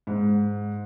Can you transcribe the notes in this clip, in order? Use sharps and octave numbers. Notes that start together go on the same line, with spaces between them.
G#2